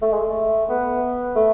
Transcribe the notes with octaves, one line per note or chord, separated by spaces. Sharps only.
A3
G#3
A3
B3
A3